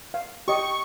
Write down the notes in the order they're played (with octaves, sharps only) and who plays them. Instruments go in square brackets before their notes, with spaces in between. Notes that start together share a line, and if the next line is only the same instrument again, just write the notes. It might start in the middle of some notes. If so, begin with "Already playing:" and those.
[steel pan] F5
[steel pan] G4 D#5 [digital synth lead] C#6